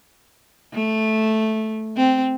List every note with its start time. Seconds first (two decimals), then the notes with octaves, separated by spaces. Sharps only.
0.74 A3
1.97 C4